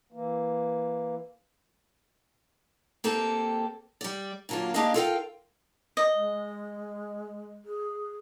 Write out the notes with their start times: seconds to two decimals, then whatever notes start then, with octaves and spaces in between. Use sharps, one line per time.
0.12 E3 A#3
3.04 A#3 C4 G4 A4
4.01 G3 D5
4.49 A#2 D3 F#3 A#3 F4
4.74 A#3 D4 G4 G#4 D#5 F5
4.94 F4 A4 A#4 E5 F5 G5
5.97 D#5
6.15 G#3
7.65 G#4